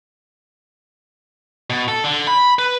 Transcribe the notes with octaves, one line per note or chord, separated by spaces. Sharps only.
B2
A4
D3
B5
B4